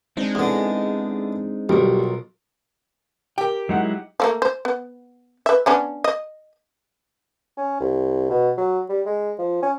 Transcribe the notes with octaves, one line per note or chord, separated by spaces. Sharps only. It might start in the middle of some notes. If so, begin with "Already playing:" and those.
G#3 C4 D4 D#4
E2 D3
B1 G3 F4 A#4 C#5
G4 A#4 G5
F#3 G#3 D#4 E4 F#5
F3 A3 A#3
C5
B3
B4 E5
B3 C#4 D4
D#5
C#4
C2
B2
F#3
G3
G#3
F3
C#4